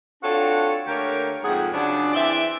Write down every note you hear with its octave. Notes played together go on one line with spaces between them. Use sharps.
C4 D4 F4 F#4 A4 C#5
D3 A3 A#3 G4 A#4 C#5
F2 G#2 C3 G#4 F#5
C#3 F3 F#3 D4
E3 C4 C5 D5 E5